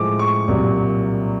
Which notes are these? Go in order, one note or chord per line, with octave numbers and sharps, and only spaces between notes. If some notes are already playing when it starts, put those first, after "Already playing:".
Already playing: A2 F3 G#3 D6
C#6
C2 A#2 F#3 A#3